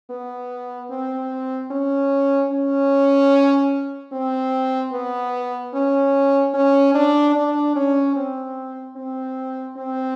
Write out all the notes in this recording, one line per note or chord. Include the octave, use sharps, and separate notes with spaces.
B3
C4
C#4
C#4
C4
B3
C#4
C#4
D4
D4
C#4
C4
C4
C4